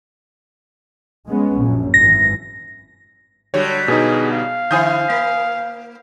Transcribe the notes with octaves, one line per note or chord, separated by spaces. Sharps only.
G#3 B3 C#4
A#1 F#2
G#1 E3 A#6
D3 F#3 G3 C#5
B2 B3 D#4 G#4
F5
D3 E4 C5 G#5 D#6 G6
A#3